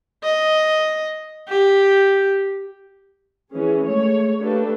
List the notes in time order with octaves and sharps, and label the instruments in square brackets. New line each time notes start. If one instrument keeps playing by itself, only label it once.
[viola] D#5
G4
[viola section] E3 C#4 G#4
G#3 A3 C#5
A3 A#3 D4 G4 A4 B4